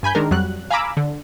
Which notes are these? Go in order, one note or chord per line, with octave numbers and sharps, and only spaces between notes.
G2 G#5 B5 G6
D#3 G#3 D4 A#4
F2 F#3 G3 F#6
F5 G#5 A#5 B5 D6 E6
D3